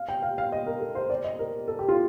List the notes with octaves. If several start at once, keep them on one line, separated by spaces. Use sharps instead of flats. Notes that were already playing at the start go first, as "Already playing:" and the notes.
Already playing: F5
G5
F5
F5
D#5
A#4
A4
C5
D5
D#5
A#4
A4
G4
F4